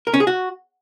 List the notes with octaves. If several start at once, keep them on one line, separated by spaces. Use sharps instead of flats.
A#4
C#4
G#4
F#4